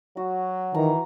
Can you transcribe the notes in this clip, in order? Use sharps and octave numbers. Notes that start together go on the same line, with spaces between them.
F#3 F#4
D#3 E3 A#5